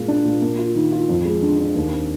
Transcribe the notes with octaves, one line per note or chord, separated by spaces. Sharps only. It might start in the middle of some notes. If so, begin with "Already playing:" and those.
Already playing: A#2 G#3
D4
A#2
A#3
F4
D#3
F4
F2
G#3
D3
D4
D#2
C4